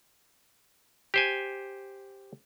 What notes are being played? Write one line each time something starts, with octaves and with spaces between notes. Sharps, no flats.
G4 C5 G#5